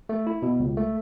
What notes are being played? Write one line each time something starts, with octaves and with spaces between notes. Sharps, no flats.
A3
E4
B2
C#2
A3